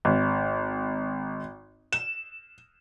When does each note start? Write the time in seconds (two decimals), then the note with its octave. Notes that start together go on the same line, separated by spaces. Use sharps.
0.05 G#1
1.93 E7